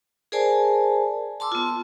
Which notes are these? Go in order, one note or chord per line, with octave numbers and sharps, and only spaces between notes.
G#4 A#4 C5 D5 G#5 A5
A5 C6 D6 E6
B3 F4